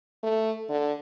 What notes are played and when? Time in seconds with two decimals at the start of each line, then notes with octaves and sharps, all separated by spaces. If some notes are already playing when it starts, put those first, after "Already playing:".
0.23 A3
0.69 D3